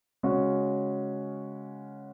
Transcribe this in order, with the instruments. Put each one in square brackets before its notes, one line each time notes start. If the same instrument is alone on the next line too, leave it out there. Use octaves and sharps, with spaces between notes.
[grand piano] C#3 G#3 C#4 F#4